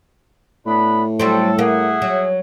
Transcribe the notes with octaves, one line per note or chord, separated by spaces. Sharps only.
A2 B3 D4 B5
F#3 G3 C4 A4
A#3 G#4 E5 F#5
F#3